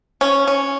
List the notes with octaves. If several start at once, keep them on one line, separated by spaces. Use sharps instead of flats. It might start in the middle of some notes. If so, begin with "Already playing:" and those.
C#4
C#4